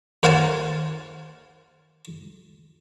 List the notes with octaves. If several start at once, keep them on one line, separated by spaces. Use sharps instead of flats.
D#2 C5 F5 F#5 G#5 A5